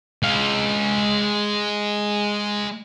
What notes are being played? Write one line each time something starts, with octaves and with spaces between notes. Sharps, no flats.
G#3 F5